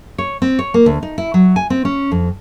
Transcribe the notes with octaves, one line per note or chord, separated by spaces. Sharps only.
C#5
C4
C#5
A#3
D2
D#4
E4
F#3
G#5
C4
C#4
F2